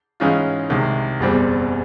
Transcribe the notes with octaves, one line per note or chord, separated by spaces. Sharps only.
G#2 E3 G#3 C#4 F4
C2 C3 D#3 G#3
F#1 E2 B2 G3 C4